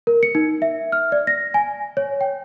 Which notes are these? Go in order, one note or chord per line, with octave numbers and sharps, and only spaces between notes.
A#4
C#7
D#4
E5
F6
D5
A#6
G#5
C#5
G5